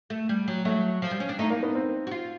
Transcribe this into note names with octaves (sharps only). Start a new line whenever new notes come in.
A3
G3
F#3
F#3 A3
F3
G3
C#4
D4
A3 D#4
A#3
B3
C4
F#4
F4